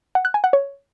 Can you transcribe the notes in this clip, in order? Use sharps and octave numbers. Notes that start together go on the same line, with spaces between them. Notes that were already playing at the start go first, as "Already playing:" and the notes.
F#5
F#6
G#5
F#5
C#5